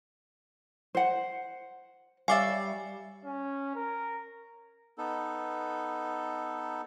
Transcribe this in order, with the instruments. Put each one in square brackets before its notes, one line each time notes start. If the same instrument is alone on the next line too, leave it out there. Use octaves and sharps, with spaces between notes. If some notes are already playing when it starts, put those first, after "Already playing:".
[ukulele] C5 F#5
[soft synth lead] G3 [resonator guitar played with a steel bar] C#5 D5 E5 [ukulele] F5 [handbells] G#5 D6 A6
[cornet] C#4
A#4
[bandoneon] B3 D#4 A4